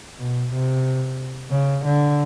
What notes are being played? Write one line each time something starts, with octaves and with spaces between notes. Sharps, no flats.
B2
C3
C#3
D3